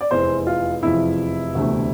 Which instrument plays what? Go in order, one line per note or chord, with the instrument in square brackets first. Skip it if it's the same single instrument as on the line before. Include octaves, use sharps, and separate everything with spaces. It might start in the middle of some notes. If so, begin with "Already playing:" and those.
[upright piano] D5
F1 E2 E3 C5
F4
F1 E2 C3 F3 E4
E1 D2 C3 E3 A3